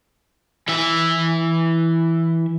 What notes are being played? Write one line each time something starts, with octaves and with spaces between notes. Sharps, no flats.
E3 E5